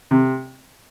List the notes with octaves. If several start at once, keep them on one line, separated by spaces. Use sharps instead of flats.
C3